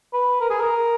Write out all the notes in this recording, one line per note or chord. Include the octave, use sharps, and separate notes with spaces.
B4
A#4
G#4
A#4